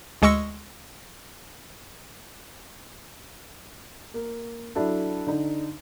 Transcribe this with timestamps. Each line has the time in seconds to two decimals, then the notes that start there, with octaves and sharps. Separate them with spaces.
0.22 D2 G#3 D#5 C#6 E6 C#7
4.14 A#3
4.75 F#3 D4 E4 A4
5.27 D3 D#4